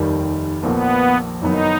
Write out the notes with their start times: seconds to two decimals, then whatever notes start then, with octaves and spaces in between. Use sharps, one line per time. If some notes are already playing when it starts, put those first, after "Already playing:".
Already playing: F1 D#2 D#3 G3
0.63 A#1 A#2 F3 B3
1.41 F#1 F#2 D#3 F#3 B3 D#4